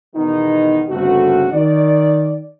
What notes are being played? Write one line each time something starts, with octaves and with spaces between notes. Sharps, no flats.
E2 B2 D#3 G#3 B3 D#4
G1 C#3 A3 C4 F#4
D#3 D5